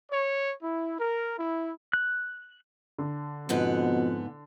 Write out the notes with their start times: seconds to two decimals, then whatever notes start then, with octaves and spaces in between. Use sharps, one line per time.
0.11 C#5
0.63 E4
0.99 A#4
1.37 E4
1.93 F#6
2.98 D3
3.49 F2 G#2 B2 B3 F#5